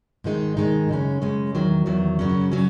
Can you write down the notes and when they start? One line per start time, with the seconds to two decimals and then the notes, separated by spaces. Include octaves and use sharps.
0.24 G#2 D#3 G#3 D#4
0.57 G#2 D#3 G#3 D#4
0.89 F#2 C#3 G#3 C#4
1.22 F#2 C#3 G#3 C#4
1.55 E2 D#3 F#3
1.86 E2 D#3 F#3
2.19 F#2 C#3 F#3 C#4
2.52 C#3 F#3 C#4